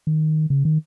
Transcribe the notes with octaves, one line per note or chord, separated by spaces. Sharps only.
D#3
C#3
D#3